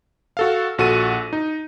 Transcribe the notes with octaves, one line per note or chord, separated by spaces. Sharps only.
F#4 A4 F5
A#1 F#4 A4 D#7
D#4